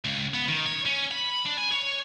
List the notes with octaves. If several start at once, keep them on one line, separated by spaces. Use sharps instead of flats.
C#2
B3
D#3
C#5
C#4
B5
D4
G#5
C#5